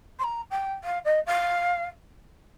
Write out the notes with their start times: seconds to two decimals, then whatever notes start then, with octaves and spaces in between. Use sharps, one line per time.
0.19 C6
0.23 A#5
0.50 G5
0.83 F5
1.04 D#5
1.26 F5